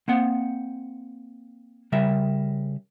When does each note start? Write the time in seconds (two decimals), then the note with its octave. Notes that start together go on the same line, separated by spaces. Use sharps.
0.08 A#3 C4 F#5
1.92 C#3 G3 A#4 E5